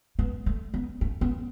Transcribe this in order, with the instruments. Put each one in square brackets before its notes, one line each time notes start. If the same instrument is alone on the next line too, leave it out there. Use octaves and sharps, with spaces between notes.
[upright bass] B3
A3
B3
A3
B3